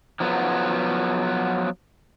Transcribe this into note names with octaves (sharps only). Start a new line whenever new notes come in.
F3 F#3 B3